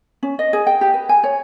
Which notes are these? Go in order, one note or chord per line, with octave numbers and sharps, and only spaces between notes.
C#4
D#5
G#4
G5
G4
B4
G#5
C#5